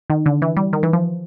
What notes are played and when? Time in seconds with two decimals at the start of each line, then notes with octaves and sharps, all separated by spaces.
0.10 D#3
0.26 D3
0.42 E3
0.57 G3
0.73 D#3
0.83 E3
0.93 F3